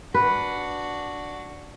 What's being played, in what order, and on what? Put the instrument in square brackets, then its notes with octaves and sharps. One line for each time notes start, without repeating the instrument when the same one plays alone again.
[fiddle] D4 F#4 [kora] B4